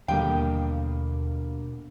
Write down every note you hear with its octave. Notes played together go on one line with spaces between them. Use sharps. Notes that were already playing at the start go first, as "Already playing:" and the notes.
D#2 B2 D3 G3 A#3 D#5 F5 G5